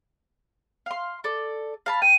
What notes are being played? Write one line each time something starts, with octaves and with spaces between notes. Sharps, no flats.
F5 C6
A4 D5
F5 A5 B5
G5 D#7